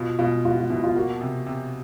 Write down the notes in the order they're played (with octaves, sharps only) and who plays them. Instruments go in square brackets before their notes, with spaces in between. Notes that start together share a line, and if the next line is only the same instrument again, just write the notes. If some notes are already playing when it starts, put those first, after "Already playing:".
Already playing: [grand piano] B2 [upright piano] F4
[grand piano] B2 [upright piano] F4
[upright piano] F4 [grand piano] F#4
[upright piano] F4
[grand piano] B2 [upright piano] E4
[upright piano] F4
[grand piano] A#3 [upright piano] F#4
[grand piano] C3
C3